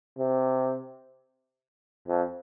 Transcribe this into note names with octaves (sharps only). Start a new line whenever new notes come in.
C3
F2